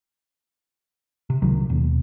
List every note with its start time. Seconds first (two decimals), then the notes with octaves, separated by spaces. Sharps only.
1.30 C3
1.42 C#2 D#3 F#3
1.70 D#2 B2